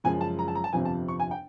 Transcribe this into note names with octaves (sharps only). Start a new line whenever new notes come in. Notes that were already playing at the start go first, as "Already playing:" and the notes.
F#1 F#2 C#3 F3 G#3 G#5
A5
A#5
A5
A#5
A5
G1 F2 C3 F3 G#5
A5
C#6
G#5
G5